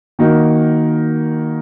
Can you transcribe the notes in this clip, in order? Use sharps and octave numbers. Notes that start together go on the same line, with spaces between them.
D#3 A#3 D#4 F#4 A#4